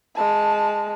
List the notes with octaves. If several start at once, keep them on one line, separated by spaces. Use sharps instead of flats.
G#3 A5